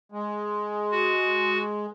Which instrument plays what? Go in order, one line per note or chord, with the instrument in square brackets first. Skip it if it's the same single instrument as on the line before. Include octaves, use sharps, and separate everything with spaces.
[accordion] G#3
[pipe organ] F#4